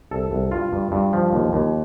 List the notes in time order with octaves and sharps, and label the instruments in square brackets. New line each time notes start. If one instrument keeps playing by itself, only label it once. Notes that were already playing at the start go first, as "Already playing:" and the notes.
[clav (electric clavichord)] C2 A4
C2
G2 F4
G2
G2
F3
D#2
D#2